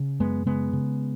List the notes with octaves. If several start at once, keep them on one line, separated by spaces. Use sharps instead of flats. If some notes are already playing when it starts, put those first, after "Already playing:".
Already playing: C#3
F#2 G#3 B3
C#3 G#3 B3
C#3